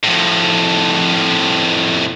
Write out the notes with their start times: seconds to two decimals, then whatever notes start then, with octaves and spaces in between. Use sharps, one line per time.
0.04 F2 A2